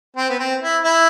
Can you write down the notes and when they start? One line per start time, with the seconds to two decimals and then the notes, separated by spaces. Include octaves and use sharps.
0.17 C4
0.29 B3
0.39 C4
0.62 E4
0.83 E4